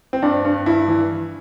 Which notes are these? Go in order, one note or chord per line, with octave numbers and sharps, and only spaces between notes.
C4
G2 D4
G2
G2 E4
E3